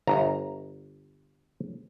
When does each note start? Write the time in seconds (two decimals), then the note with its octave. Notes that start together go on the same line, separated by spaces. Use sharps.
0.07 G1 A#5